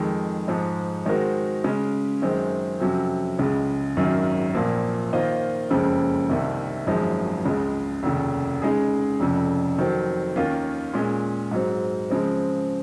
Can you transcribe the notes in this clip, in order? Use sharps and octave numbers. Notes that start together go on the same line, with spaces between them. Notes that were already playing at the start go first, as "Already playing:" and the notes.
Already playing: F2 D#3 G#3
G#2 F3 G#3
D#3 G#3 C4 F#4 A#4
C#3 G#3 C#4
F#2 D#3 G#3 C4
F2 C3 F#3 C#4
C#2 C#3 G#3
G#1 F#2 D#3 F#3 C#4
A#1 A#2 F3 A#3
D#3 A#3 F4 C5 D#5
F#1 F2 C#3 G#3 C4
C2 C3 D#3
G#1 F#2 F3 G#3 D#4
C#2 C#3 G#3
F1 D#2 C#3
C#3 G#3 D#4 G#4
F1 F2 C#3
F2 D#3 F#3 C4
D#2 D#3 A#3 C#4 F4
A#2 G#3 C#4
G#2 F#3 C4
C#3 F3 G#3 C4